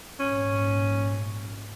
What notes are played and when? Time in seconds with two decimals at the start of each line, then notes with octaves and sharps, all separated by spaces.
0.20 A#1 G#2 C#4